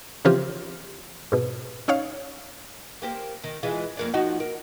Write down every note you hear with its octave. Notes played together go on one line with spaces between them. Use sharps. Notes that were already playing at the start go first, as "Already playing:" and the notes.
C#3 E3 F3 C4 F4 G4
G#2 B2
C#4 D#4 C#5 F5
A#3 G4 C5
D#3
E3 G#3 F4
F2 A#3 D4
F3 D#4 F#4
A#4